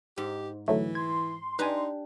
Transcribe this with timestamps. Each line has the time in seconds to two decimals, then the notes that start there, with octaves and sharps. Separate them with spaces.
0.18 G#2 G4
0.68 D3 E3 F#3 A3
0.95 C6 G#6
1.59 D4 D#4 G4 B4 G#5